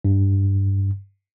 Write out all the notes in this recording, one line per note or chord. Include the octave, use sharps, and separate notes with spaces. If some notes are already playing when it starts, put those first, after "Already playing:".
G2